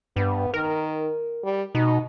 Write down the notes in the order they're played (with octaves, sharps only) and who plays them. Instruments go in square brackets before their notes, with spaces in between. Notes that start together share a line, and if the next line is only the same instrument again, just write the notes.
[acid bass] G2 [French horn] B3
[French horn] D#3 [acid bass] A#4
[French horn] G3
[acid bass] B2 [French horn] D#4